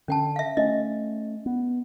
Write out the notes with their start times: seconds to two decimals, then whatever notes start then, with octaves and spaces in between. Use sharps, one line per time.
0.08 D3 C#4 G5 A5
0.36 E5 F5
0.57 A3 C#4 D#5
1.46 B3